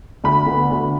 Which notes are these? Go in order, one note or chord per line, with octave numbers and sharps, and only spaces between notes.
D2 B5
D3 B3
D2